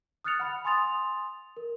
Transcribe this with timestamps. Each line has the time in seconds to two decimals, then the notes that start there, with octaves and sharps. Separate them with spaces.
0.24 D#6 F6 F#6 A6 C#7 F7
0.40 F#5 B5
0.65 G#5 C6 D#6 A6 F7
1.57 A#4